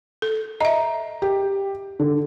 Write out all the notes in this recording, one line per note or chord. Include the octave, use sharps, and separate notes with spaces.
A4
D#5 E5 A#5
G4
D3